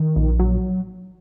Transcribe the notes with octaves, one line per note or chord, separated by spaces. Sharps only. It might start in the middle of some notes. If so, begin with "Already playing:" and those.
Already playing: D#3
A#1
F#3